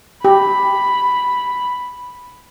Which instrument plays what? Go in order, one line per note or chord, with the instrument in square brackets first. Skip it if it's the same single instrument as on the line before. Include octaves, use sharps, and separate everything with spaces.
[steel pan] G4 [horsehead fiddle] B5